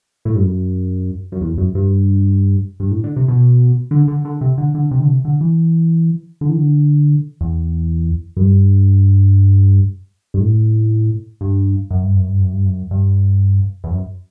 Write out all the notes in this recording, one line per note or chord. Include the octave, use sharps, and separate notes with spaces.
A2
G2
F#2
F#2
E2
F#2
G2
G2
A2
D3
C3
B2
D3
D3
D3
C3
D3
D3
C3
D3
C3
D3
E3
D3
E3
D3
E2
F#2
G2
G2
A2
G2
F#2
G2
F#2
G2
F#2
G2
F#2
G2
E2
F#2